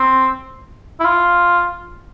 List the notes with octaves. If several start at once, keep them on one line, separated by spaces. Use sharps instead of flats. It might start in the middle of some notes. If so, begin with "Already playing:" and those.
Already playing: C4
E4
F4